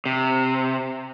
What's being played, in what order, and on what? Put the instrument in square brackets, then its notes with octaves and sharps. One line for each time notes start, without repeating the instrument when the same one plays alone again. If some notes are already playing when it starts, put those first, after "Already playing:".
[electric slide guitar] C3